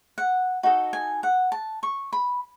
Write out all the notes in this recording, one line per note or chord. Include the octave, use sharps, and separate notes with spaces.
F#5
D#4 F#4 A4 D#5
G#5
F#5
A5
C#6
B5